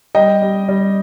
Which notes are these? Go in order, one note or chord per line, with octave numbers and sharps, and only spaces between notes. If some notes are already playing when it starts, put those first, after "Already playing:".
G3 D#5 G5
G3
G3